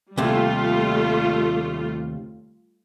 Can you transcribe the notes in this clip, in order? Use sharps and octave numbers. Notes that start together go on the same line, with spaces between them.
D#2 C3 G3 A3 F4